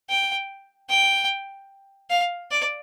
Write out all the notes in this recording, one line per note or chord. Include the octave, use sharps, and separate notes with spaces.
G5
G5
F5
D5